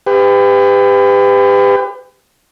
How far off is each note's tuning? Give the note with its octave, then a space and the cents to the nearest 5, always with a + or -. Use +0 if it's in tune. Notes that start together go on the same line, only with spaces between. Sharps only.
G4 +30 B4 +35